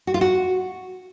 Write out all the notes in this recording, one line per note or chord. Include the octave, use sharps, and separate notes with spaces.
F#4
F4
F#4